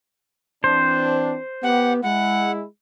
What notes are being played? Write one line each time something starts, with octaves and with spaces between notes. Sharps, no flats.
E3 C4 D4 C5
B3 G4 F#5
G#3 E4 F#5